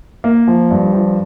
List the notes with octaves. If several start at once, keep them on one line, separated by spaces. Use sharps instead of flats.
A#3
F3
G2
F3